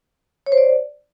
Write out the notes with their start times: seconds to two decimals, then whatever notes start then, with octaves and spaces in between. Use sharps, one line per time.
0.46 C#5
0.52 C5
0.58 D5